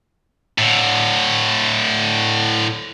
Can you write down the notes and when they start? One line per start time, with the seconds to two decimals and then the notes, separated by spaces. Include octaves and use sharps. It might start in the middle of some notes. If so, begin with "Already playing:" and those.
0.58 A2 D3